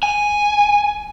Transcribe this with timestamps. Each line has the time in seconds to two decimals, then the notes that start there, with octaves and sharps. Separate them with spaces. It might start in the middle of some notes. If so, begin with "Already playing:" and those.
0.03 G#5